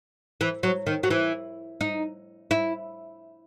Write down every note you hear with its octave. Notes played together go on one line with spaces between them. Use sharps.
E3
F#3
D#3
F#3
E3
D#4
E4